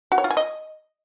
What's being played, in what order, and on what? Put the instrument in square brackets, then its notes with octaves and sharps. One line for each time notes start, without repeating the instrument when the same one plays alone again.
[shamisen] F#4
C#5
F4
G#5
D#5